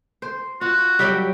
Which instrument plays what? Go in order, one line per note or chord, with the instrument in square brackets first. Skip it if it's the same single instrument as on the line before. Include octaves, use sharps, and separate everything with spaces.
[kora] C5
[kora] F4 [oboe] F#4
[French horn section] F#3 G4 C#5 [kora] G3 E5 G5